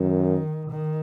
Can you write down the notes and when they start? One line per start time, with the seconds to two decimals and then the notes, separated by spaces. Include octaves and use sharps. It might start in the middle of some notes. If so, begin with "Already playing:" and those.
Already playing: F#2 D#3
0.71 D#3